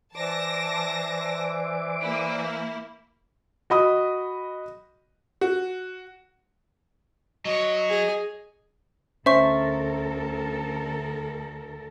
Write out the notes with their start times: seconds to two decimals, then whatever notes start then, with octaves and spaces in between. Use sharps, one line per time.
0.15 E3 C5 D5 A5 D6 A#6
2.01 A#3 E4
3.70 F#4 D#5 B5 D#6
5.41 F#4
7.45 F#3 C#5 D#5
7.90 G#4
9.26 D2 C#4 A4 A#4 C5 E5 C#6